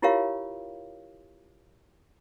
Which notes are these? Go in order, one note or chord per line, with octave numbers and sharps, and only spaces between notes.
E4 F4 G4 A#4 C#5 F5